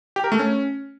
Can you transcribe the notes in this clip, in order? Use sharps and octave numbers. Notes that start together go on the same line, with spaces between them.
G4
A#4
A3
C#4